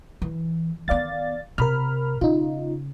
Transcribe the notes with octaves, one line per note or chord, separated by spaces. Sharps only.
E3
D#3 B3 D5 F5 A6
C3 A#4 B5 F6
C#3 D#4 F4